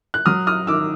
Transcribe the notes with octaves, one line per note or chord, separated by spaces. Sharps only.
F#6
F#3 D#6 F6
D#6 F6
D#3 D6 E6